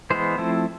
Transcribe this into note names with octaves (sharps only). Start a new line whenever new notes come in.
E3 G#3 B3 C5
F3 A3 C4 E4